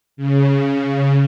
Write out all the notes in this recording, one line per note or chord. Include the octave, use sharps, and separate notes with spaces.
C#3